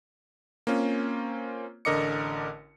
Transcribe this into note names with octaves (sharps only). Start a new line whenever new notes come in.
A#3 C4 C#4 F4
A1 D3 A#4 D#5 D6 C#7